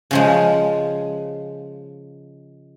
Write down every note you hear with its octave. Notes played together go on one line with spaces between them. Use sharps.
C#3 F3 G#3